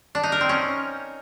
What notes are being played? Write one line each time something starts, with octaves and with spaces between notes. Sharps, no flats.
D4
D#4
A#4
C4
C#4